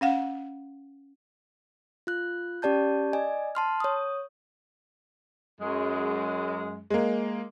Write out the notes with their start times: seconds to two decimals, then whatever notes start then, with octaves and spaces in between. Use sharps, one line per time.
0.01 C#4 F5 F#5
2.07 F4 F#6
2.62 C#4 G4 D5 A5 G6
3.13 D5 D#5 G#5
3.55 A5 C6 F6
3.80 C#5 D#6
5.61 F#2 G#3
6.90 G#3 A#3